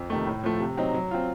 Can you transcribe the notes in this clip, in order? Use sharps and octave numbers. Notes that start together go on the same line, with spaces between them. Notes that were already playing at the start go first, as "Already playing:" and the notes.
Already playing: F2
C3 D#3 A3
A2
F3 A3
C3
F#3 C4 D#4
F#3
C4 F4